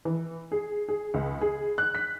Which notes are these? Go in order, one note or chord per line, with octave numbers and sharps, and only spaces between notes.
E3
G#4
G#4
C#2
G#4
F#6
B6